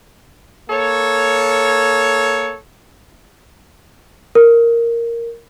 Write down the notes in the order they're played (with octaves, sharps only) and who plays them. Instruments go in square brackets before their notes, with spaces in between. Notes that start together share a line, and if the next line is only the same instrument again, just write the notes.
[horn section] A#3 A4 C#5
[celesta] A#4